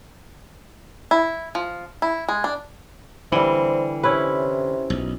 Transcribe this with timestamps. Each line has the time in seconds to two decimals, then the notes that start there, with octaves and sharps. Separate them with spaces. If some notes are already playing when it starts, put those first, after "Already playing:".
1.11 E4
1.55 F3
2.02 E4
2.28 G#3
2.44 D4
3.32 D3 E3 G3 C4
4.03 C3 C#4 E4 B4
4.90 B1